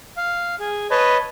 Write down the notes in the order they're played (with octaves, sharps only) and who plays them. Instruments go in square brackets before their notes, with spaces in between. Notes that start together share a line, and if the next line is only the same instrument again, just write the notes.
[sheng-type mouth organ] F5
G#4
[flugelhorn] B4 [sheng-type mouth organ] C#5 D#5 A5